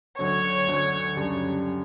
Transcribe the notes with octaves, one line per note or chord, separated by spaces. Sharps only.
D2 D3 F#3 C#5
D2 D3 F#3
F#2 C#3 G3 D4